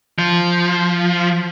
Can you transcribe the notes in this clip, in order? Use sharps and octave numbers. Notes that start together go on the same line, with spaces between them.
F3